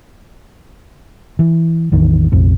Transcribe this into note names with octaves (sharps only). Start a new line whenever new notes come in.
E3
A1 E2 D#3
A#1 F2 C3